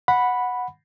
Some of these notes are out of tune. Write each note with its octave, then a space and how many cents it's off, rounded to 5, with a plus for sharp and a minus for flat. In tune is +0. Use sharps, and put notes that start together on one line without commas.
F#5 -10 B5 +0